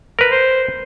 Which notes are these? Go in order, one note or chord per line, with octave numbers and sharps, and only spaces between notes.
A#4 B4
C5